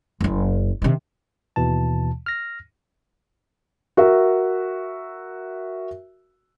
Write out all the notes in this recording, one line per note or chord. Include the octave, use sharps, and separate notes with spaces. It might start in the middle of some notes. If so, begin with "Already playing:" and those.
F#1 F#2
C3 D#3
D#2 B2 E3 A5
F6 A#6
F#4 A#4 E5